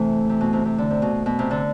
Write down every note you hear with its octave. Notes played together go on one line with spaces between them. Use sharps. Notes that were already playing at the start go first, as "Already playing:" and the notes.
Already playing: C3 E3 A3
C3
B2
C3
C3
D3
C3
B2
B2
C3
D3